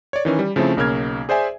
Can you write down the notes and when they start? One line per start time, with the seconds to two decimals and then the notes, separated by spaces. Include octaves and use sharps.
0.13 C#5 D5
0.25 D#3 E3 C#4
0.39 G3
0.56 C#3 F3 A3 C4 E4
0.77 B1 C#3 A#3 F6 G#6
1.29 G#4 C5 D5 E5 G#5